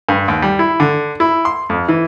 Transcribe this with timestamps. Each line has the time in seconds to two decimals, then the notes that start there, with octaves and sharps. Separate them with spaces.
0.09 G2
0.28 D#2
0.42 G3
0.59 E4
0.80 D3
1.20 E4
1.45 C6
1.70 F2
1.89 E3